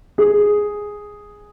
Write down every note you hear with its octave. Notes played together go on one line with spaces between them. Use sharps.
G#4